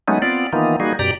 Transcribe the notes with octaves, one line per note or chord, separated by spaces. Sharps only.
F#3 G#3 A3 B3 C#4 D#4
B3 C4 F4 D5
D#3 E3 A#3 B3 D#4 F4
G3 A#3 D#4 F#4 G#4
F#2 B2 G4 D5 A#5